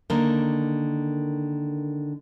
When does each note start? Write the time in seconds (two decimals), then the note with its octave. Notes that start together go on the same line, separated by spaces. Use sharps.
0.10 D3 D#3 A#3 A#4